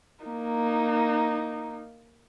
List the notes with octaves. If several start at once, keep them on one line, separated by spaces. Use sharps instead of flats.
A#3 D#4